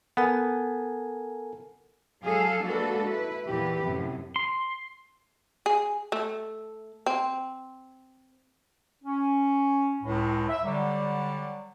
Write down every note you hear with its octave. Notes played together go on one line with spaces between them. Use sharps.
B3 A4 A#4 G#5
F#3 G#3 G#4 A4 F5
G#3 A#3 D4 F#4 A4 B4
E4 B4
E2 A#2 E3 G4 B4
F#2 A2 C3
C6
G#4
A3
C4
C#4
C#2 A2
E5
D3 F#3 G3